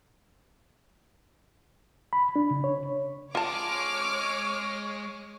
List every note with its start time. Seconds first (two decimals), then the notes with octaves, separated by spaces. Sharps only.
2.13 B5
2.36 D4
2.51 C#3
2.64 C#5
3.35 G#3 F4 C#5 A5 C6 D6 F6